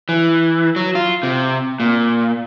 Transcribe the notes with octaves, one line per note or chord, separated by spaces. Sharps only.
E3
F#3
F4
C3
A#2